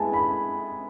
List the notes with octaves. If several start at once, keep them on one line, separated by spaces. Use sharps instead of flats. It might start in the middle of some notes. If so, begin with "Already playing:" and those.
Already playing: G#3 B3 E4 G#5 A5
B5